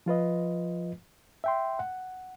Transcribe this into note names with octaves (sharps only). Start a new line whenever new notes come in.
F3 F4 B4 D#5
E5 G5 C6
F#5